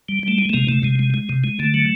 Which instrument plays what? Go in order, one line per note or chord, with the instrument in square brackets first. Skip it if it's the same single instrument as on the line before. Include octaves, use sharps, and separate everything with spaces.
[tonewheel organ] G3
G3 A3
G#3
A3
C3 G#3 A#3
C3 A3
C3 G#3
G#3
G#3
C3
G#3
D3 A3
F#3